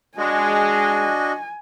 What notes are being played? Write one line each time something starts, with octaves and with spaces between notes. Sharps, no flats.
G#3 D4 F#4 D#5 G#5